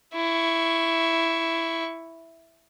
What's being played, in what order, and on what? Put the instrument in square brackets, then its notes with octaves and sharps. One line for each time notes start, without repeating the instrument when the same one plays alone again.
[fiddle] E4 C#6